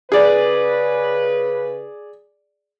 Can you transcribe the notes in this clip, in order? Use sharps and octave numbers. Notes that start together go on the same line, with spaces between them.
C#3 G#4 B4 D5